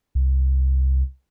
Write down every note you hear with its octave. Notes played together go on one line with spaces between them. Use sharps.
C2